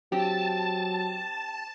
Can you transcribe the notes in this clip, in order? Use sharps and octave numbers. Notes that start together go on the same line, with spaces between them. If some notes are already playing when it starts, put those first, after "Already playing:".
F#3 C4 G4 A5